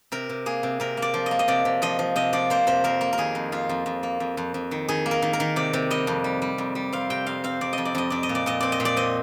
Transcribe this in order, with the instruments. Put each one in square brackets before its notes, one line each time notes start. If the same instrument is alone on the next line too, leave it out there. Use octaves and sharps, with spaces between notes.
[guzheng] C3 A#4
C3
A#3 G#4
C3
C3 A#4
A#3
D5
F3
A#3 D#5
D#5
C3 D5
C3
F3 D#5
F3
C3 D#5
F3 D5
A#3 C5
C3 C5
F2 A#4
A#3
A#4
D#3 G#4
F2
F2 F4
F2
F2
A#3
F2
F2
F2
D#3
D#3 G#4
A#3
A#4
D#3
A#4
D#3
C3 D5
C3
G3 D#5
F2
G3
G3
F2
G3
C4 F5
C3 G5
F2 F5
C4 F5
F2 D5
F2 D#5
D5
F2 D#5
F2 D5
D#5
A#2
D5
A#2 D#5
C4 D5
D#5
A#2
D5
C4 D#5